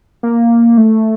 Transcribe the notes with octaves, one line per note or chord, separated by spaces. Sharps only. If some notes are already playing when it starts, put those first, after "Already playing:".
A#3
A3